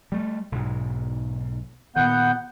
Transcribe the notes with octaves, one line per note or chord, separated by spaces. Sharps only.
G3 A3
B1 G#2
A#2 D#3 B3 F#5 G6